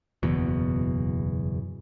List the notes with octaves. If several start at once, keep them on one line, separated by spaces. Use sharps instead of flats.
F#1 E2 B2